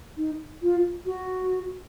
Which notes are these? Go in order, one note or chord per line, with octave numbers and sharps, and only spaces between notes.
D#4
F4
F#4